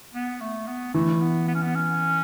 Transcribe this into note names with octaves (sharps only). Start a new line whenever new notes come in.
B3
A3
B3
E3 A3
B3
B3
C#4
B3
C#4